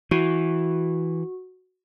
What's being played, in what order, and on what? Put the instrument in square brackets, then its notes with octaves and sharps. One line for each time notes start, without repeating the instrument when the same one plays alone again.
[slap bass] E3 [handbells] F#4